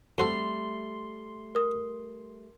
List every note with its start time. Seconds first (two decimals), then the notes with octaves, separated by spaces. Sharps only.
0.18 F2 G3 A3 F#4 A4 C6 C7 G7
1.55 A#4 D#6